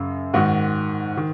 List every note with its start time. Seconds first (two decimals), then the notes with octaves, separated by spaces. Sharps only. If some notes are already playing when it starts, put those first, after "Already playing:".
Already playing: F#2 C#3
0.34 G#2 D#3 F#4
1.17 D#3